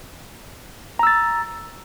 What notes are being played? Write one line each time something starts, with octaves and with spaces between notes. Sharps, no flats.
A#5 E6 A6